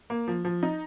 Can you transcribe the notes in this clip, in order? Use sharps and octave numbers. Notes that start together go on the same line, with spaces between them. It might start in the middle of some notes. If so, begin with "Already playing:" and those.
A#3
F3
F3
D#4